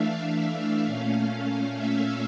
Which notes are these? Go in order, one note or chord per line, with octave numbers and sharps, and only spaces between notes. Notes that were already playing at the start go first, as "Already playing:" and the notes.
Already playing: E3 A3 D4 E5 F5
A#2 A3 C#4
E5